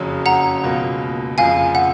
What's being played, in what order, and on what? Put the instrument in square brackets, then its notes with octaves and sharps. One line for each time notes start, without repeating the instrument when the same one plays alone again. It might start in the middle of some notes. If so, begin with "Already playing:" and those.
Already playing: [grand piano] F#1 F2 C#3 F#3 C#4
[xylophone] F#5 A#5
[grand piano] C#2 B2 A#3 F4
[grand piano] F1 F2 C#3 F3 [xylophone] F5 G#5
[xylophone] F#5